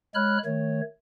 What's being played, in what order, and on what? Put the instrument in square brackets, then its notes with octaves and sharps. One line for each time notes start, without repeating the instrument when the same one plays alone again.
[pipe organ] G#3 C#5 B5 F6 F#6
D#3 A3 C#5